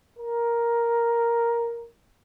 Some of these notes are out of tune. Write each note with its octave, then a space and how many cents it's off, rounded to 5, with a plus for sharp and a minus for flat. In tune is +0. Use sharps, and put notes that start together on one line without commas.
A#4 +5